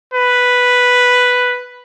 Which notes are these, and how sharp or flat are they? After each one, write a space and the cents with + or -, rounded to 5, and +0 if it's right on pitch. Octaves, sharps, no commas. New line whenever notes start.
B4 +0